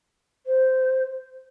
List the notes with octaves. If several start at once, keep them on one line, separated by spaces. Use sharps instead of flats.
C5